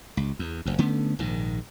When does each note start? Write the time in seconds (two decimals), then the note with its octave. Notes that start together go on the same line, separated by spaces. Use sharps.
0.17 C#2
0.39 E2
0.66 F#1 D2
0.78 D3 A3 B3 C#4
1.19 A#1 G#2 D#3